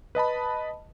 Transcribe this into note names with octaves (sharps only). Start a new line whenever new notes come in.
B4 D#5 A5 B5